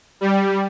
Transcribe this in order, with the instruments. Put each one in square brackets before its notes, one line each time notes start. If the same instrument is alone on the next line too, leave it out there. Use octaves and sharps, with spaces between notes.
[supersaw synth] G3